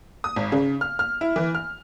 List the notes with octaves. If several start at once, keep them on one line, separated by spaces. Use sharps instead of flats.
D#6
G#1
C#3
F6
F6
E4
E3
F6